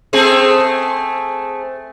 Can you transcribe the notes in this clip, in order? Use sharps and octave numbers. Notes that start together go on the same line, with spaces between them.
A3 C4 G#4